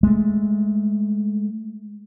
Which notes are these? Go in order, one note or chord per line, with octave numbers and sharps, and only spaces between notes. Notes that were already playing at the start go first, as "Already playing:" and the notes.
G#3 A3